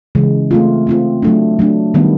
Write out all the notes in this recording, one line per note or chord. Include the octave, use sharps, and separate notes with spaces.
C#3 E3 G#3
A3 C4 F4
A3 C4 F4
F#3 A3 D4
F#3 A3 D4
D#3 G3 B3